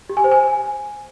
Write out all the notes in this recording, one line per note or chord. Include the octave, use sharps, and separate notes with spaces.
G4
G#5
C5
G#5